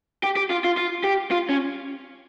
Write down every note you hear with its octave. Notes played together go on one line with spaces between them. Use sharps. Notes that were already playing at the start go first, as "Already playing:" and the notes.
G4
G4
F4
F4
F4
G4
F4
C#4